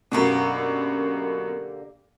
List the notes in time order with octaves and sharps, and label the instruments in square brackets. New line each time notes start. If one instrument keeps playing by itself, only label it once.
[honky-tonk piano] F#2 B2 [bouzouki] D3 A#3 G4